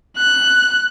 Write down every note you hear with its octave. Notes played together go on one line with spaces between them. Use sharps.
F#6